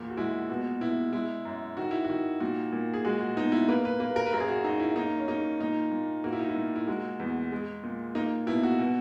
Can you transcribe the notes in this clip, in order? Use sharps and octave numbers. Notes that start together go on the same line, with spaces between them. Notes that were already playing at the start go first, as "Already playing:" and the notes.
Already playing: E2 A#2
F#4
G#3 E4
B2 F#4
B2 E4
G#3 E4
F#2
D#3 F#4
E4
F#4
D#3
A#2 F#4
A#2
G#4
G#3 F#4
F#4
B2 D#4
E4
A#3 B4
B4
A#3 B4
A#4
B4
F#2 A#4
G#4
F#4
F#2 D#4
E4
A#3 D#4
C#4
A#3 D#4
A#2 D#4
A#2
A#3 F#4
E4
D#4
E4
A#2
E4
G#3 F#4
E2
G#3
A#2
A#3 D#4
B2 E4
F#4
B2